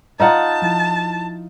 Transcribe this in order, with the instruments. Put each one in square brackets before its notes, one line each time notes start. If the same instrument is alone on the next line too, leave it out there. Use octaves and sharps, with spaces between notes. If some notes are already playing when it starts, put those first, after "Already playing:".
[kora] D#4 F4 F#5 [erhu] A5
[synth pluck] F3 E4